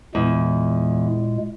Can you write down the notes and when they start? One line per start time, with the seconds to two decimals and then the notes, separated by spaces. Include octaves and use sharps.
0.15 E2 A#2 G#3